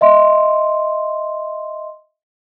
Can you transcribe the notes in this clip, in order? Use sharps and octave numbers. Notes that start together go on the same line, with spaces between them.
D#5 E5 C6